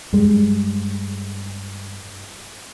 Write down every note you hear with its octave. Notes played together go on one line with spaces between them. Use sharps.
G2 G#3